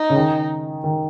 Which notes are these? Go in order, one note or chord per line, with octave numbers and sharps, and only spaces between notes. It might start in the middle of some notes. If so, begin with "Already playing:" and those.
Already playing: D#4
C#3
D#3
D#3